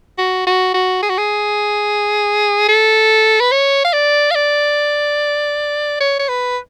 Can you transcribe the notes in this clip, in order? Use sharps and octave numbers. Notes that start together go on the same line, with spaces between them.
F#4
F#4
F#4
G#4
F#4
G#4
A4
B4
C#5
F5
D5
F5
D5
C#5
C#5
B4